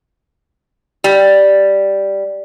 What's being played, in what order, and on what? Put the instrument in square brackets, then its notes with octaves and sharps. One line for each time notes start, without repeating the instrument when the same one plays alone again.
[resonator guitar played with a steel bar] G3